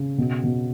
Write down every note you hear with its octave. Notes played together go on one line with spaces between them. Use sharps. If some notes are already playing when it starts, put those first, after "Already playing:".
Already playing: C#3
B2
B2